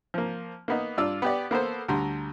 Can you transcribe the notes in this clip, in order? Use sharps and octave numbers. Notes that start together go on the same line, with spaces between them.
F3 A#3
A#3 B3 D#4
G2 F4 D5 E6
B3 G4 D5
A#3 B3 A4 C5
D2 G3 A#5 C6